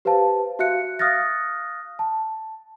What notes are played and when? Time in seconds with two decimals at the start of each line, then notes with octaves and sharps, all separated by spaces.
0.05 G4 B4 C5 F5 A5
0.59 F#4 E5 F5 F#6 C#7
0.99 F5 D#6 F6 F#6 A6 A#6
1.99 A5